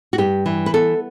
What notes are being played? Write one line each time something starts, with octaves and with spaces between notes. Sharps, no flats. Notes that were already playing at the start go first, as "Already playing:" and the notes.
F#4
G2 G4
E3
B4
B3 A4